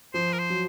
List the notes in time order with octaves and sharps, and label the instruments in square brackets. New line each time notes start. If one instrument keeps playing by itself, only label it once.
[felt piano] F3 [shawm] C5
[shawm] A#4
C5
[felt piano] F#3